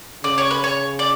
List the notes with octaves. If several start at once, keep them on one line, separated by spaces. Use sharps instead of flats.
C#3 D5
C#5
B4
C#5
D5